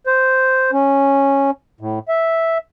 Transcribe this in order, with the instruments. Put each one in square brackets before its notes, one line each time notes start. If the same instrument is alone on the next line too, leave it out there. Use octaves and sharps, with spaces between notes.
[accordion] C5
C#4
A2
E5